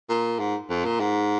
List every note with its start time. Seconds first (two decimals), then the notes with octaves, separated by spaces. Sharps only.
0.09 A#2
0.39 G#2
0.69 F2
0.84 A#2
1.00 G#2